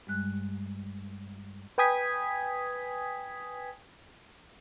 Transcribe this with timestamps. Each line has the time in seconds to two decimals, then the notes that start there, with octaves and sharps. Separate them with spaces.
0.07 G2 G3 G#3 F#6
1.78 B4 G5 G#5 D#6 G#6 B6